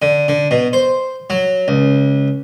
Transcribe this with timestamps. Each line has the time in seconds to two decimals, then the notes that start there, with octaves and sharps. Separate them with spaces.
0.02 D3
0.28 D3
0.51 B2
0.73 C5
1.30 F#3
1.68 C#2